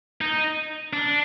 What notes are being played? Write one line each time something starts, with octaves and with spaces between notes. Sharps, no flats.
D#4
D4